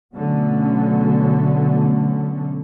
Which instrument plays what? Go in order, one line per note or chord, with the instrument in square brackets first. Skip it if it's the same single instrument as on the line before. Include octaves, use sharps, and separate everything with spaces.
[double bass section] B2 D3 F#3 A3 B3 C#4